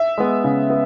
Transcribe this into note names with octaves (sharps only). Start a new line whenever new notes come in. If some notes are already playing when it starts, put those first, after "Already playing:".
Already playing: E5
G#3 B3
C#3
B3